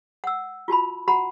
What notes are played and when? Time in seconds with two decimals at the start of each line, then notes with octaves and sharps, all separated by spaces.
0.24 F#5 E6
0.68 F4 F#4 A5 B5
1.08 F#4 F#5 A#5 B5